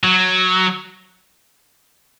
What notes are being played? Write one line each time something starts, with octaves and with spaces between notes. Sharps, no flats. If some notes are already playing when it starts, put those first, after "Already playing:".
F#3